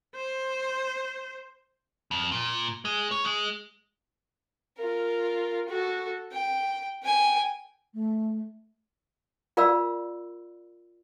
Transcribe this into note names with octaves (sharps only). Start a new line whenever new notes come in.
C5
F2
A#2
G#3
C#5
G#3
F4 A#4
F#4 A4
G5
G5 G#5
A3
F4 A#4 D5 F5 B5 E6